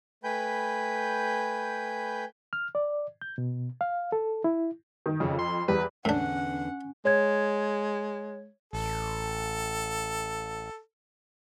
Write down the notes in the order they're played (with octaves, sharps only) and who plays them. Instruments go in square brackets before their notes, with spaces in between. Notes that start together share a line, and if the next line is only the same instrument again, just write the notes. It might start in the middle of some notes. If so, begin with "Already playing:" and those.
[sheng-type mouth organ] A3 B4 G5 G#5 B5 G6
[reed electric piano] F6
D5
G6
B2
F5
A4
E4
[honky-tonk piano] D#3
[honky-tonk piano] F2 [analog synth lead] C#3
[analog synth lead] C6
[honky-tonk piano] E2 G3 [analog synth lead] B4
[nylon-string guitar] E2 D3 [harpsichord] A2 D4 [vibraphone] C#4 G#5 [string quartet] F#5
[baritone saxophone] G#3 [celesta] C#5 G#6
[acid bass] A1 [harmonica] A4